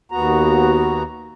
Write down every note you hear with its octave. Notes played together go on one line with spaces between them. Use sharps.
D#2 B3 F#4 A#5